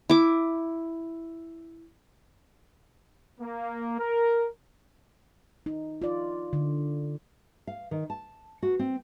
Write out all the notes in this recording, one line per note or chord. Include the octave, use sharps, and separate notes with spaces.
E4 D6
A#3
A#4
D#4
F4 D5
D3
F5
D#3
A5
F#4
C4